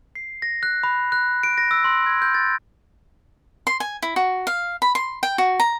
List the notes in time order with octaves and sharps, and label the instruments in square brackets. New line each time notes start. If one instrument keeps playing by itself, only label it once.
[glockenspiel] C7
A#6
F#6
B5
F#6
D7
A#6
E6
C6
G#6
G6
A6
[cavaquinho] C6
G#5
E4
F#4
F5
B5
C6
G5
F#4
A#5